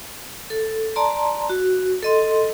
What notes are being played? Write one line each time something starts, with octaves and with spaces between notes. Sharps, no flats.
A4
D5 A5 A#5 C6
F#4
A4 D#5 C6